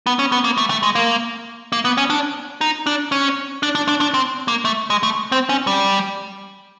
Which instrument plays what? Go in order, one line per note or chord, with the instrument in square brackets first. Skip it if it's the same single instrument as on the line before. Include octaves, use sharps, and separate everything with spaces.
[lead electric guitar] B3
C#4
B3
A#3
A3
A3
G#3
A#3
A#3
B3
C#4
D4
D#4
D4
C#4
D4
D4
D4
D4
C4
A#3
A3
G#3
A3
C4
C#4
G3